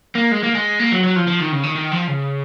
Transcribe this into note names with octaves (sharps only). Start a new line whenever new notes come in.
A#3
G#3
A#3
G#3
A#3
F#3
F#3
F3
F3
D#3
C#3
D#3
D#3
F3
C#3